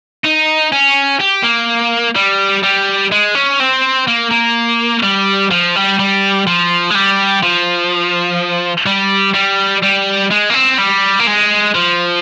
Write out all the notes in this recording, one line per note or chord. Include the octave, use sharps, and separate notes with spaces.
D#4
C#4
G4
A#3
G3
G3
G#3
C#4
C4
A#3
A#3
G3
F3
G3
G3
F3
G#3
G3
F3
G3
G3
G3
G#3
A#3
C4
G3
A#3
G#3
F3